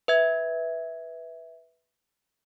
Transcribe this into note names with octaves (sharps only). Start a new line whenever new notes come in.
B4 E5 G#6